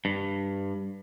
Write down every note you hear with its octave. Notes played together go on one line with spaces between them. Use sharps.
G2